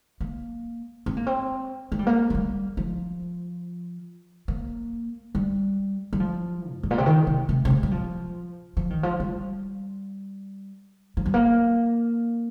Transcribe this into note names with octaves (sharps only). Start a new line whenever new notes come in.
A#3
C4
A#3
C4
A#3
G3
A#3
F3
G3
F3
A#3
G3
G3
F3
F2
G2
A#2
C3
D#3
C3
C3
C3
A#2
G3
F3
F3
D#3
F3
G3
F3
G3
A#3